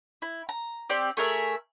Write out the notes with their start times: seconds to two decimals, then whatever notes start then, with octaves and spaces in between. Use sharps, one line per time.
0.22 E4
0.49 A#5
0.89 C4 G4 D5
1.17 A3 G#4 A#4 E5